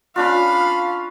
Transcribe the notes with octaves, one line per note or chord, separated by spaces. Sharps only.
C#4 D4 F4 F5 B5